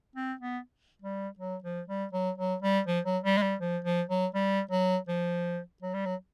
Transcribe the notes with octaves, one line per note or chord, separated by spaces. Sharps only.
C4
B3
G3
F#3
F3
G3
F#3
F#3
G3
F3
F#3
G3
G#3
G3
F3
F3
F#3
G3
F#3
F3
F#3
G3
F#3